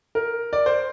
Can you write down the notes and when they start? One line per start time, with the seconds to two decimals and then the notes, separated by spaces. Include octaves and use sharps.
0.15 A#4
0.53 D5
0.66 C5